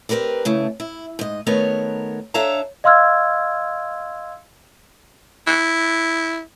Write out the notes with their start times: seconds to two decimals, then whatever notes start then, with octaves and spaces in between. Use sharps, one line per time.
0.09 C4 G4 A#4 B4 D5
0.45 C#3 A3 E4
0.80 E4
1.19 G#2 D#5
1.46 D#3 A3 B3 A#4 C#5 F#5
2.34 D4 A4 C#5 E5 F5 A#5
2.84 D#5 F5 C6 E6 F6 G#6
5.47 E4